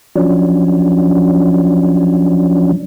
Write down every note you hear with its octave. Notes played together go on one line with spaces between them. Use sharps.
F3 F#3 C#4 D4